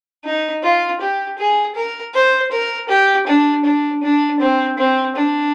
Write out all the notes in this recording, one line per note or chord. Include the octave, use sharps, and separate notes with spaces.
D#4
F4
G4
G#4
A#4
C5
A#4
G4
D4
D4
D4
C4
C4
D4